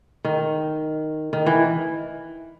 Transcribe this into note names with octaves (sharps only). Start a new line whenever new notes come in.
D#3
D#3
E3